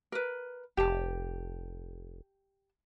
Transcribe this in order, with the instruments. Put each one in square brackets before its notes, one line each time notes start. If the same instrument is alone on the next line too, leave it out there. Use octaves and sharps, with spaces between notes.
[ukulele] A#4 B4
[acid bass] F1 [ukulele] G4 A5